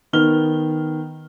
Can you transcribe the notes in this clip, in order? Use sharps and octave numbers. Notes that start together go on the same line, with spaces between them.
D#3 B3 F6 G7